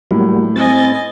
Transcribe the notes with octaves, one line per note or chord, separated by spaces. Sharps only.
A2 F#3 G3 A#3
C4 D#5 G#5 A6